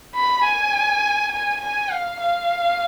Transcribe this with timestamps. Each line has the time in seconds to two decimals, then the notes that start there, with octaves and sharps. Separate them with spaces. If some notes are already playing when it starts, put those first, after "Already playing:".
0.15 B5
0.44 G#5
1.32 G#5
1.61 G#5
1.91 F5
2.20 F5